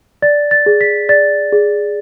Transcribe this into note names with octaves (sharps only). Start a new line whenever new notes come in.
D5 A6
A6
G#4
B6
D5 A6
G#4